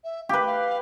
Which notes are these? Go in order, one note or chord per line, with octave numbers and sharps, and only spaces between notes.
E5
G4 B4 F5
F5